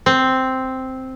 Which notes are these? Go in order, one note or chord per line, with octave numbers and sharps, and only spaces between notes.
C4